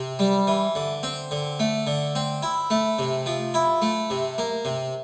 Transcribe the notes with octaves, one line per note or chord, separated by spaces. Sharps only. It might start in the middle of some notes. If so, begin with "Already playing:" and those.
Already playing: C3
G3
E3
D3
C4
D3
A3
D3
C4
E4
A3
C3
F3
E4
A3
C3
A#3
C3